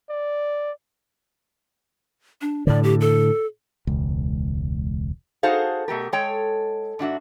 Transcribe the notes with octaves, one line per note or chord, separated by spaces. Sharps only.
D5
D4
A2 D3 D5
G4
A4
E1 C#2
D#4 F#4 G#4 A4 C5 F5
B2 A3 G4 A#4
G#3 A4 C#5 G5
G#2 D4 F#4 E5